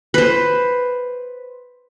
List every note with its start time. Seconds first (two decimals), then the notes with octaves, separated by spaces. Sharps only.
0.14 B4 C5